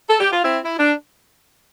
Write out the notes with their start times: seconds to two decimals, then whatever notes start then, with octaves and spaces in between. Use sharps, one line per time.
0.09 A4
0.20 G4
0.32 F4
0.44 C4 E4
0.64 E4
0.78 D4